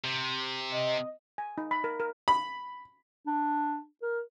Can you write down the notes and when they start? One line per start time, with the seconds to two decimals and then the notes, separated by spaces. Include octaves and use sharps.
0.05 C3
0.72 D#5
1.38 G#5
1.58 D#4
1.71 B5
1.84 A#4
2.00 A#4
2.28 B5
3.27 D4
4.02 A#4